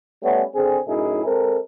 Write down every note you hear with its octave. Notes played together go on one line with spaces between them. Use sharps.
G3 A3 B3 C#4
D3 C4 G#4
F#2 A2 D#4 E4 G#4
G#3 C4 A4 A#4